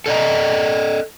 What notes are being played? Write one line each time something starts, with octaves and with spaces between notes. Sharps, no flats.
A4 D5 D#5 A#5